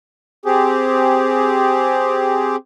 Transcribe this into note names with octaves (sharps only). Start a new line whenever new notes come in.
C4 G4 G#4